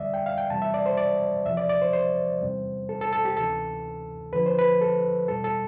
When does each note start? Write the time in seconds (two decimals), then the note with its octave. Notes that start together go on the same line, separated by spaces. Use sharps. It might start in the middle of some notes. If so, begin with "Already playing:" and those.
Already playing: E2 D3 G3 D5 E5
0.14 G5
0.26 F5
0.38 G5
0.50 E2 C3 E3 G3 A5
0.62 E5
0.74 D5
0.86 C5
0.97 D5
1.45 E2 C3 F3 E5
1.57 D5
1.69 D5
1.81 C5
1.93 C5
2.41 E2 C3 G3
2.89 A4
3.01 A4
3.13 A4
3.25 G4
3.37 D2 C3 E3 A4
4.33 E2 D3 F3 B4
4.46 C5
4.59 B4
4.81 A4
5.28 E2 B2 G3 A4
5.44 A4